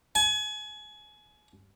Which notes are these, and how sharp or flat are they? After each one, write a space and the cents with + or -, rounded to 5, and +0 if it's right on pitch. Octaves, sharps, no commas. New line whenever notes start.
G#5 +30